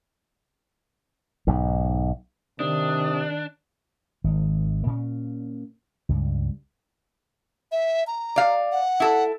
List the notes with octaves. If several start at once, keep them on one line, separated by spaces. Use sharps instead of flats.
B1 G#2
C3 D#3 D4 D#6
G#1 D#3
A#2 C#4
C#2 G2
E5
A#5
D5 F5
F#5
E4 A4